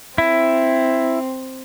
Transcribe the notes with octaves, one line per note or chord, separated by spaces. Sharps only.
C4 E4